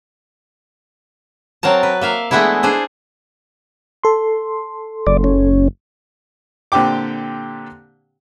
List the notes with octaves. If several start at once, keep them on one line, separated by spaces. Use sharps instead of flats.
F#3 C4 A#4 A5
B4
A#3 E5 F5
E3 G#3 A3 B3 D4 E4
D4 G#4 C5
A4 C6
F#1 D5
C#4
A#2 D3 C4 G4 G5 D6